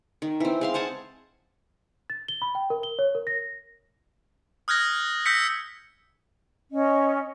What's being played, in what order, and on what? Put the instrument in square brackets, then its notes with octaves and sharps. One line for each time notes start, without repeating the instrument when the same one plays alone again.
[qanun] D#3
E3 C4
G#3 F5 C6
C5 F#5 G#5 A5
[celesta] A6
G7
B5
G5
A#4
G7
C#5
A#4
A#6
[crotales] D#6 F6 F#6 G#6 A#6
E6 G6 A#6 B6 C#7
[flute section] C#4 D#5